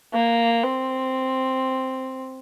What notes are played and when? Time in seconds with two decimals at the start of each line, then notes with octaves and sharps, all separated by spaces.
0.14 A#3
0.64 C4